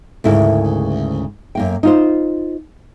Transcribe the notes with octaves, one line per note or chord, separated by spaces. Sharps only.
D2 G#2 C#3 E4 A#4
F#2 A#3 G5
D#4 F4 C5